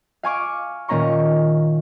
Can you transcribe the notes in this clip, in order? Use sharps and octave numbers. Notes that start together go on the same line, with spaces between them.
F5 G#5 C#6 D6
A#2 D#3 A#3 C#4 A#5 C#6